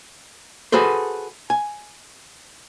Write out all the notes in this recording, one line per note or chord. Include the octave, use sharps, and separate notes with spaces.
F#4 G#4 A4 B4 C5
G#5